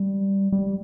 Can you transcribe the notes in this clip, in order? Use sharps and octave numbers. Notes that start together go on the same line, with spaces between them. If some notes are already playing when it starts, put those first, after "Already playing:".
Already playing: G3
G3